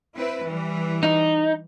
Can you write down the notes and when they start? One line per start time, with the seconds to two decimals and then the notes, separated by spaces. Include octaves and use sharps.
0.15 C4 E4 B4
0.45 E3 G3
1.03 D#4